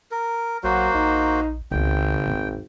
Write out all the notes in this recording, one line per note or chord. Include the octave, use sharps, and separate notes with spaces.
A#4
A#1 F#3 A#3 F#4 C5
A#1 D#4
G#1 C#2 C#3 B3 G5
A#1 F2